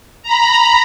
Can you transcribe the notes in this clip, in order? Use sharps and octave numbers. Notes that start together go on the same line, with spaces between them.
A#5 B5